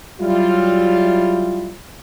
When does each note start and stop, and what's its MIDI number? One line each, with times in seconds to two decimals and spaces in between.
0.21 1.74 54
0.21 1.74 55
0.21 1.74 64
0.21 1.74 65